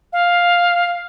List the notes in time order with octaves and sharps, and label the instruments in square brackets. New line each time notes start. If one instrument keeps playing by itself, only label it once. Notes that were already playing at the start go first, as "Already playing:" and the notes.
[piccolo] F5